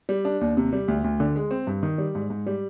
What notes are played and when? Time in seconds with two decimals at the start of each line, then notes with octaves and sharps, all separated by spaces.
0.09 G3
0.25 D4
0.41 D#2
0.57 C3
0.73 G3
0.88 D2
1.04 D2
1.20 D3
1.36 G#3
1.51 C4
1.67 G2
1.83 D#3
1.98 G3
2.15 G#2
2.30 G#2
2.46 G3